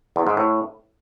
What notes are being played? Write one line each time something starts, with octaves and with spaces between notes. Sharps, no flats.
E2
G#2
A2